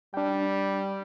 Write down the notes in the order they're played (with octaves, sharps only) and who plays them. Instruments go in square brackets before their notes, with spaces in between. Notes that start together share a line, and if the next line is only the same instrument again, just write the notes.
[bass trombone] G3 [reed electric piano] D4 G5